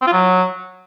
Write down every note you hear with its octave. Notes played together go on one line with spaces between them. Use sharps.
C4
F4
F#3